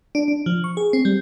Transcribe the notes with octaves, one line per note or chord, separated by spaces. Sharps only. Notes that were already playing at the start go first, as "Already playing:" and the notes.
D4
D4
F3
C#6
G#4
C4
G3